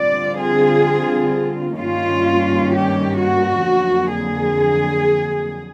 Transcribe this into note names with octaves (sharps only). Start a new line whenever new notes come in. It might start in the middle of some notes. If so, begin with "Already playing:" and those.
Already playing: D3 G3 C4 F4 D5
G#4
G2 D#3 G3 A#3 C#4 F4
G4
F#4
F2 D3 F#3 A#3
G#4